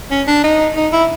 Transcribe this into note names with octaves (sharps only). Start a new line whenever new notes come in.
C#4
D4
D#4
D#4
E4